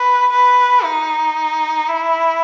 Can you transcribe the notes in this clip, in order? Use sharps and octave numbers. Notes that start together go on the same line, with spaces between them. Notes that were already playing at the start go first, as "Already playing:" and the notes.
Already playing: B4
B4
D#4
E4